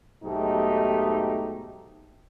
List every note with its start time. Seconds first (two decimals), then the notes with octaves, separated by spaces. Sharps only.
0.23 B1 G#2 A3 D#4 G4